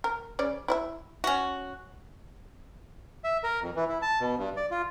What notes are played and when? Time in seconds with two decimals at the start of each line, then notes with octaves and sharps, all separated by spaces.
0.04 A#4
0.39 C#3 C#4 D5
0.68 E4 D5 E5
1.24 C#4 F#4
3.24 E5
3.44 A#4
3.62 F2
3.76 E3
3.88 E4
4.02 A5
4.20 B2
4.38 G2
4.57 D5
4.71 F4